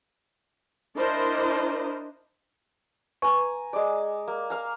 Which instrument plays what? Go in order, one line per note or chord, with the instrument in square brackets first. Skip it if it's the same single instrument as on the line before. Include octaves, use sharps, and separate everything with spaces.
[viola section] D4 E4 A#4 C5 D#5
[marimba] B4 C#6 [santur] G#5 A#5
[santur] G#3 D5
A#3
A#4 F5 A#5